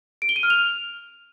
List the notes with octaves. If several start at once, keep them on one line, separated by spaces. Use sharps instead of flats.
D7
G7
D#7
F6
F7